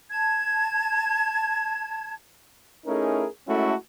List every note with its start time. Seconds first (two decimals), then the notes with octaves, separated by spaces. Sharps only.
0.09 A5 G#6
2.86 A3 C#4 D#4 E4 G#4 A#4
3.48 G#3 A3 C#4 E4 F#4 A4